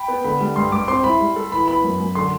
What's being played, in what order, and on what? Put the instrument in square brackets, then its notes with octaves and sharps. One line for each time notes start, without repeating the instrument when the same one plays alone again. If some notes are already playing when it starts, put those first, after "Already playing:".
Already playing: [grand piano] G5 B5
[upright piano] B3
[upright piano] D3 [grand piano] B5
[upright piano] G3
[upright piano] G2 [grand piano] C6
[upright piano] G2 [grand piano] D6
[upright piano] C4 [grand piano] C6
[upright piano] E4 [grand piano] B5
[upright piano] G3
A4
[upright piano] E3 [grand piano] B5
[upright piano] B3 [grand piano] B5
[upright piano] F#2
F#2
[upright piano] D3 [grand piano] C6